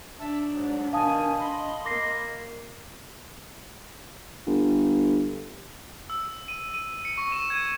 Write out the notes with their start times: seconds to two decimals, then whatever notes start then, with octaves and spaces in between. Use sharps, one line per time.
0.20 D4 E5 A5 E6
0.49 G#2 F#3
0.93 B2 D#3 F5 G#5 A5 D#6
1.39 D#5 B5 C6
1.85 A#3 D6 A#6 C7
4.47 G1
6.10 E6
6.48 D#7
6.74 D#7
7.05 C#7
7.18 C#6
7.32 E7
7.50 G#6